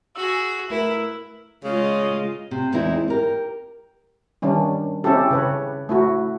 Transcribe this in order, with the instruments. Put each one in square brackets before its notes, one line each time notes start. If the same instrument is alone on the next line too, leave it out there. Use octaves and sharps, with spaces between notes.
[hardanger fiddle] F#4 G#4 [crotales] E6 F#7
[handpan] A3 A#4 B4 [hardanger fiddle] E4
[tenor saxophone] C#3 [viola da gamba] G#3 F4 D#5
[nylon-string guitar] C3
E2 E3 G#3 C4 D#4 E4
G4 A#4
[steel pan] D#3 G3 C#4 D4
C4 C#4 E4 G4 A4
C#3 B4 C#5
A3 E4 F#4